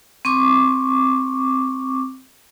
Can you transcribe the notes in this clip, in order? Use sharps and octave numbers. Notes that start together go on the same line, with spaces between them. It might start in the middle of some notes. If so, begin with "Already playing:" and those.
C4 C#6 D6